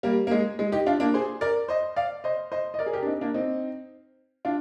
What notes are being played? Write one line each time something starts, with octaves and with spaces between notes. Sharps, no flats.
G3 A#3
A#3
G#3
G#3
D#4 G4
D4 F4
A#3 D4
G#4 C5
A#4 D5
C5 D#5
D5 F5
C5 D#5
C5 D#5
D#5
A#4 D5
G#4
G4 A#4
D4
C4 D#4
A#3 D4
C4 D#4
D4 F4